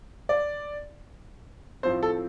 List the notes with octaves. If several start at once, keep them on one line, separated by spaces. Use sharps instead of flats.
D5
A2 F3 C4 C5
A4